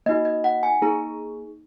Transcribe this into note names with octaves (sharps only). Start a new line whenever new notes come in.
A#3 D#4 F#4 D#5
D#5
F#5
G#5
A#3 D#4 G#4 A#5